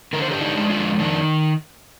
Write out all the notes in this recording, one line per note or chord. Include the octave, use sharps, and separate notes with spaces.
D3 A#4
C5
G4 A#4
D4
D#4 G4
G#3
D4 F4
F2
D#3 D4